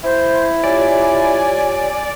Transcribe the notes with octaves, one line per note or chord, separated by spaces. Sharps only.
E4 C5
F4 G4 C#5 D5 G#5